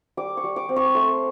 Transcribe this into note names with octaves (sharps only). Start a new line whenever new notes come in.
G3 D6
C#6
G3
D6
C4
C#6
A3 C6